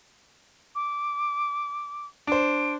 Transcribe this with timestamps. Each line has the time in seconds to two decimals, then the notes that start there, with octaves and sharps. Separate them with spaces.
0.75 D6
2.27 D4 C5 D7